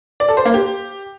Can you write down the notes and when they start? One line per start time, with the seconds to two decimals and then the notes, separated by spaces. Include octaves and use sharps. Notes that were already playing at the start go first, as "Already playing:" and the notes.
0.20 D5
0.29 A4
0.37 C5
0.45 A#3
0.54 G4